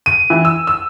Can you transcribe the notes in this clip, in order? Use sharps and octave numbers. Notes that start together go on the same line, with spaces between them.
D#7
E3
E6
E6